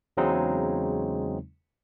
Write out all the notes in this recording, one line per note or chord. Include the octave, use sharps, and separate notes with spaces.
E2 C#3 F#3 G#3 C4 D#4